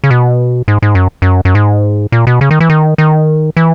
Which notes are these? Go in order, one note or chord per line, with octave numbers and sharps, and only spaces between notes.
C#3
B2
G#2
G#2
F#2
F#2
F#2
G#2
A#2
B2
C#3
D#3
E3
D#3
D#3
E3